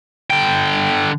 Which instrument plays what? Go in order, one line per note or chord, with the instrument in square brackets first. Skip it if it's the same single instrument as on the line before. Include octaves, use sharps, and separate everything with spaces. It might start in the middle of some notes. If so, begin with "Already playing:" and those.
[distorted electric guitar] D3 G5